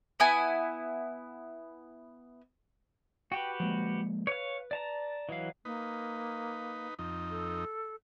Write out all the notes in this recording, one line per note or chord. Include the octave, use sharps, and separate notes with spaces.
B3 E4 G#5
F#4 G4 B4 G5
F3 G#3 A#3
B4 C#5 F5
D5 A5 A#5
E3 F#3 D#5 F5
A#3 D#4 B4
F2 D#4
A4